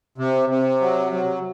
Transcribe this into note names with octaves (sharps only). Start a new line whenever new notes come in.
C3
C3
F#3
F#3